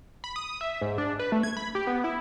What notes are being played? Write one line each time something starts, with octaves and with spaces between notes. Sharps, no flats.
B5
D#6
E5
G#2
D4
B4
A3
G#6
B5
G4
B3
E4